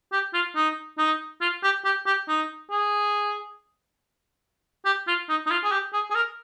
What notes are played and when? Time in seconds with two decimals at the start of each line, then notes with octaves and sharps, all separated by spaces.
0.12 G4
0.34 F4
0.55 D#4
0.98 D#4
1.41 F4
1.63 G4
1.85 G4
2.06 G4
2.28 D#4
2.70 G#4
4.85 G4
5.07 F4
5.29 D#4
5.46 D#4
5.50 F4
5.63 G#4
5.72 G4
5.93 G#4
6.10 G#4
6.15 A#4